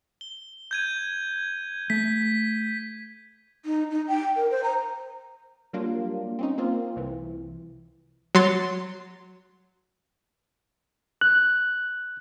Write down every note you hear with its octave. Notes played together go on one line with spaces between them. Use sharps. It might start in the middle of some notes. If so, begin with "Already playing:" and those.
G7
G6 G#6 D#7
A3 B6
D#4
D#4
G5
A#4
C5
A#5
F#3 G3 A#3 D4 F4
C4 C#4 D#4
A#3 C4 F4
C2 E3
F#3 C6 A6
F#6